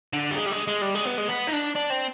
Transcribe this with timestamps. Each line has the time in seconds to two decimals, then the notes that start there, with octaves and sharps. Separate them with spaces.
0.13 D3
0.31 G3
0.36 G#3
0.46 G3
0.51 G#3
0.67 G#3
0.82 G3
0.94 G#3
1.05 B3
1.18 G#3
1.28 B3
1.47 D#4
1.52 D4
1.75 D4
1.90 C4